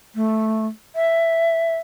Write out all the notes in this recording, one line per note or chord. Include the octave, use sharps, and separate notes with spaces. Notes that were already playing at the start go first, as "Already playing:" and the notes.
A3
E5